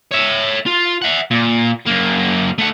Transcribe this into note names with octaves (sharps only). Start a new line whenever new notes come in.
C#5 E5
F4
E5 F#5
A#2
F#2 A#3
A3 F#5